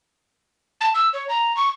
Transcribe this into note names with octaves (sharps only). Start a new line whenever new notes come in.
A5
E6
C#5
A#5
C#6